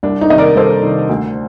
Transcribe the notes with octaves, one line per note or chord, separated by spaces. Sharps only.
C2 D4
D#4
C3 D#3 D#5
A#4 D5
C2 A4 C5
C3 D#3
D2